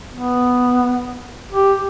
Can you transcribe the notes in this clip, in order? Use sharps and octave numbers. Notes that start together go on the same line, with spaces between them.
B3
G4